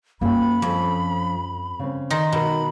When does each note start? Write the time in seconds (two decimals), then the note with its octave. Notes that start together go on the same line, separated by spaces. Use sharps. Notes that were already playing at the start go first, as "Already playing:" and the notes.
0.21 F#2 A#3 F4 A#4 G5 B5
0.62 F2 F3 C#4
1.79 C#3 C4
2.10 D#3 D#4 C6
2.32 B2 D#3 A#4 B5